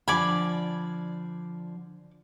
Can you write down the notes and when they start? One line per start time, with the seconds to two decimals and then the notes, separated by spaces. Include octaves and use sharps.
0.08 D3 F3 D5 G#5 B5